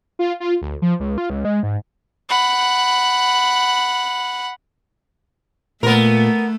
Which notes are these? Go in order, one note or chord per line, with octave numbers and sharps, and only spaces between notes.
F4
F4
D2
F3
C#2
F4
C#2
G#3
G#2
F#5 B5
A#2 A3 B3 A#4